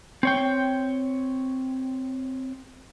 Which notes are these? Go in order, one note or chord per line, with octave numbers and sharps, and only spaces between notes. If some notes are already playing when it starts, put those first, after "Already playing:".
C4 C#5 G5